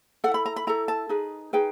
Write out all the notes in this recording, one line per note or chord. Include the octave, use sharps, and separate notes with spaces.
E4 A4 F#5
B5
A#5
B5
E4 A4 A#5
A5
D#4 G#4 B4
D#4 G#4 B4 G5